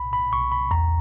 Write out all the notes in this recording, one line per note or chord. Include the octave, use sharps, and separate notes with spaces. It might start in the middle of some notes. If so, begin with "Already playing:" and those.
Already playing: B1 B5
B5
B1 C#6
B5
E2 A#5